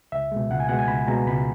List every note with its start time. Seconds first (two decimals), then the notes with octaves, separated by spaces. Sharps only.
0.12 C#2 E5
0.32 B2 G#3
0.50 C#2 F#5
0.60 G#5
0.69 B2 G#3 F#5
0.79 G#5
0.88 C#2 B5
1.07 B2 G#3 A#5
1.27 C#2 B5